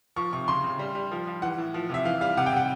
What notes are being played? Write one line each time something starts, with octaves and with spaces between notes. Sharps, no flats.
F3 C#6
C3 C#6
C#3 C6
C#3
G3
G3
F3
F3
E3 F#5
A2
F3
C3 E5
E3 F5
G3 F5
C3 F#5
G5
C3 F#5